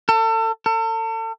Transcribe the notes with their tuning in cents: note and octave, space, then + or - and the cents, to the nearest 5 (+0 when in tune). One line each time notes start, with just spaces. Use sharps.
A4 +35
A4 +40